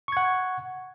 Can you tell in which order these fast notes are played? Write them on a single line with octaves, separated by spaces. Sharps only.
C#6 G#6 F#5